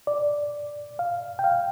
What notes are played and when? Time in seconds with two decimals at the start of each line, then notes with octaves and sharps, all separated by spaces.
0.07 D5
0.99 F5
1.39 G5
1.44 F5